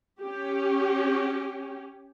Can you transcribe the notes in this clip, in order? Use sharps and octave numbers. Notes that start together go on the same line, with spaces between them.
C#4 G4